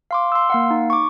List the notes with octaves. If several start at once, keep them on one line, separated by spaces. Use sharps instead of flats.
F5 C6 D6
C6 E6
A#3 F5 F#5
D#4
C#6 D6